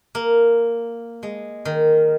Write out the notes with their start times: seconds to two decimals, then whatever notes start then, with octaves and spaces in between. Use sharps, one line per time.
0.15 A#3
1.23 G#3
1.65 D#3